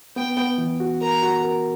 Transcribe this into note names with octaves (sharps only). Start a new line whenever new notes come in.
B3 G5
B3
E3
F#4
A#4 A#5
F#4
A#4